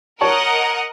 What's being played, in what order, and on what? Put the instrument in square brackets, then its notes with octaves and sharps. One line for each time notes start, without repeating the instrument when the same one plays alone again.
[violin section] A#4 D#5 F#5 [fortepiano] C#5 A5 C#6